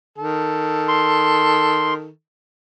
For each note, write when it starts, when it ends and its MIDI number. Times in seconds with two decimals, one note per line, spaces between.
0.18 2.09 51
0.18 2.09 69
0.88 1.94 84